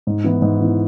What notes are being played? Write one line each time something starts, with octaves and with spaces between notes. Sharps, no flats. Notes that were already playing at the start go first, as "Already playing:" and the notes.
G#2
E3 B3 E4
G#2
E3 B3 E4